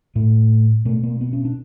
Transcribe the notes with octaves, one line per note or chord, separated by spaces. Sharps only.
A2 A3
B2 A3
A#3
B3
C#4
D4